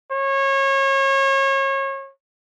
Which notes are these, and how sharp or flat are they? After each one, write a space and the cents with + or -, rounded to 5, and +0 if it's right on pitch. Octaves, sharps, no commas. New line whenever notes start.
C#5 -30